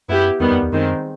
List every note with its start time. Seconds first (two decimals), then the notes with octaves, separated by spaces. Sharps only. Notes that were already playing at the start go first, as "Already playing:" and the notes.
0.08 F#2 B3 E4 G4
0.40 E2 D#3 G3 B3
0.51 F2
0.62 E2
0.72 F#2 D#3 G#3 C4